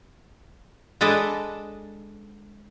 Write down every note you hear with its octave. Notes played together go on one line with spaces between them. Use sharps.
G#3 D4 A4 B4 D#5